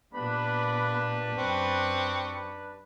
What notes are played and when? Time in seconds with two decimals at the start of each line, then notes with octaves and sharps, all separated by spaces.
0.14 A#2 A#3 B3 D4 G4 B4 B5
1.38 F#2 C4 C#6